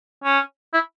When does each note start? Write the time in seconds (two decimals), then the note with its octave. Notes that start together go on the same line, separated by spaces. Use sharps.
0.24 C#4
0.74 E4